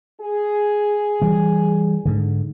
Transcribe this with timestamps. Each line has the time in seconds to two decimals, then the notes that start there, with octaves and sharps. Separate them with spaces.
0.20 G#4
1.22 E3 G3
2.05 G#2 D3